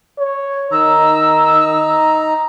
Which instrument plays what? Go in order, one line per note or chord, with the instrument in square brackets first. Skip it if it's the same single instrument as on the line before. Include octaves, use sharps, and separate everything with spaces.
[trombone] C#5
[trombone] D#3 [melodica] D#4 A#5 [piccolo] E6